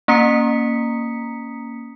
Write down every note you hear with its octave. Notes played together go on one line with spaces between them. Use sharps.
A#3 C#4 A#5 D#6 B6 C#7